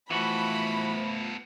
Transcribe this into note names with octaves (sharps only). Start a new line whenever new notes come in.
E3 F3 A3 B3 F#4 A4 B5